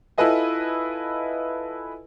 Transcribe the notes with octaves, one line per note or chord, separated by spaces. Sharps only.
E4 F4 A4 B4 D#5 G#5